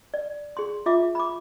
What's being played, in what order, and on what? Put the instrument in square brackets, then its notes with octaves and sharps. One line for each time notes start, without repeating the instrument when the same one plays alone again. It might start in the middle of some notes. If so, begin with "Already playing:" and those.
[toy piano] D5
G#4 C6
F4 E5 D6
B5 D6